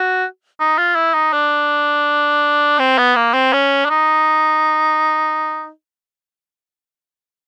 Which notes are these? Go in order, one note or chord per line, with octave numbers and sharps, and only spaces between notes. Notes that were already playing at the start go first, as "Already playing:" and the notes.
Already playing: F#4
D#4
F4
E4
D#4
D4
C4
B3
A#3
C4
C#4
D4
D#4